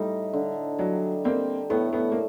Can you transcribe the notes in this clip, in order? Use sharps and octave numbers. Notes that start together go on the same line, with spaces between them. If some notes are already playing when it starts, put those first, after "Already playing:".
Already playing: A2 G3 A3 D#4
D3
F#3 G3
G3 A#3 C4
A2 A3 B3
A3 B3
A#3